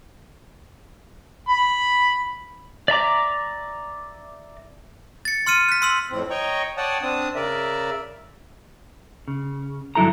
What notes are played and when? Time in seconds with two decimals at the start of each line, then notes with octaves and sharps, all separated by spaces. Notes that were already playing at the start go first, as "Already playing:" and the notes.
1.48 B5
2.88 D5 E5 A#5 D6
5.25 A6 C#7
5.46 C6 F6 C#7 D#7
5.69 F#6 B6
5.82 C6 E6 F#7
6.11 F2 A2 C4
6.30 C#5 D#5 G5 A#5 C#6
6.77 C#5 D5 F#5 G5 A5 D#6
7.02 C4 D4 A5 D#6
7.35 C#3 A#4 D5 E5
9.28 C#3
9.95 G2 D3 F#3 E4 A4 A#5